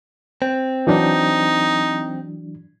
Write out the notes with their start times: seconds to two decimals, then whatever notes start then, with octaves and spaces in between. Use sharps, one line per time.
0.42 C4
0.87 E3 F#3 D4 D#4